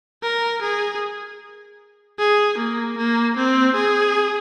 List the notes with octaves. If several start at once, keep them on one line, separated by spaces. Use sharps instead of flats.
A#4
G#4
G#4
A#3
A#3
C4
G#4